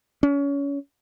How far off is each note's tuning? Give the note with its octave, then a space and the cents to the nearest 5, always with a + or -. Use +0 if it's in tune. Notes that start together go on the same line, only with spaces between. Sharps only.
C#4 +25